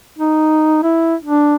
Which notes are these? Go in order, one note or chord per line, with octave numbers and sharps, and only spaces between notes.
D#4
E4
D4